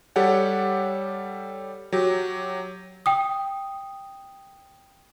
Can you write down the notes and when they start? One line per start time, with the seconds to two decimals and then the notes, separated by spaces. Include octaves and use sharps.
0.16 G3 G4 A4 C#5 F#5
1.92 F#3 G4
3.06 G5 D#6